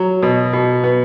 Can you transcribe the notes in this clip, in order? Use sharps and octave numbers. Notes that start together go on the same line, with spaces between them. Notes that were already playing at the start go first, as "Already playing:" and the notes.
Already playing: F#3
B2
B2
B3